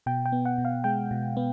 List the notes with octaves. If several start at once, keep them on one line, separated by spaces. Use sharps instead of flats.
B2 G5
G5
B3
F#5
B2
F5
G#3 G5
B2
B3